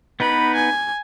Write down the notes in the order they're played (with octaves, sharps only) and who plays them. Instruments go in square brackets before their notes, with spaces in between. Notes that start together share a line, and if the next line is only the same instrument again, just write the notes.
[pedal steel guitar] B3 D#4 B4 [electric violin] B5
[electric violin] G#5